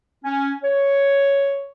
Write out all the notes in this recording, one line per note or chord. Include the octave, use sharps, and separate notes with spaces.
C#4
C#5